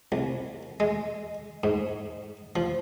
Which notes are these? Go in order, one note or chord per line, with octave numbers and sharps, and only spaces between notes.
C2
G#3
G#2
F3